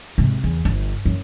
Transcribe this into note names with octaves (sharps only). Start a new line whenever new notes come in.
G#2 C3
E2
G1
F#2